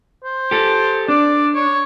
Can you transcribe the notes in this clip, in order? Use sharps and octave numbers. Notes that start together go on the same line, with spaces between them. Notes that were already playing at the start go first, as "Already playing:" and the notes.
C5
G4 A4
D4 D5
C#5